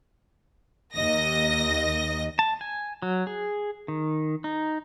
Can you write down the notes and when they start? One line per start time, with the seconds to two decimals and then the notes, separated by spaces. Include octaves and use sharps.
0.95 D#2 D#5 A#6
2.39 A5
2.61 G#5
3.02 F#3
3.27 G#4
3.88 D#3
4.44 D#4